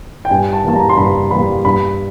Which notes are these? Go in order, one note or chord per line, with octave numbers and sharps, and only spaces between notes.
G5
G2 G#5
A5
E3 G3 A#3 A5
A#5
C6
G2 B5
E3 G3 A#3 B5
G2 B5